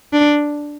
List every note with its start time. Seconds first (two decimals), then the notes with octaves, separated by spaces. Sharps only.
0.13 D4